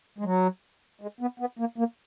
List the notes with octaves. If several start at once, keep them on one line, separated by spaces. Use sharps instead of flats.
G#3
F#3
G#3
B3
B3
A#3
A#3